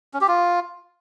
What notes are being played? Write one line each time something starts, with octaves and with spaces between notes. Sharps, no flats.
C#4
G4
F4